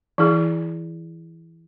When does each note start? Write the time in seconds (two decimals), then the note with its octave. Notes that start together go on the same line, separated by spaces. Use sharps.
0.18 E3 E4 G#4